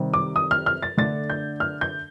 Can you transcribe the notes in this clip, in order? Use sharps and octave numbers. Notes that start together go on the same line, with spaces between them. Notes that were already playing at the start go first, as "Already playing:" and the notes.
Already playing: C3 D#3 G3
D6
D#6
F6
F6
A6
D3 A3 D4 A6
G6
F6
G6